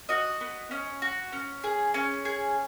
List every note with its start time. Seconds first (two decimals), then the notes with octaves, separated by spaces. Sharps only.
0.09 F#4 D#5
0.41 B3
0.71 C#4
1.02 F#4
1.32 C#4
1.64 G#4
1.94 C#4
2.25 G#4